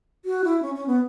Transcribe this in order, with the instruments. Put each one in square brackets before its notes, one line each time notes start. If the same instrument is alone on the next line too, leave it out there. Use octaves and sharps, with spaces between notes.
[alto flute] F#4
E4
C#4
C#4
B3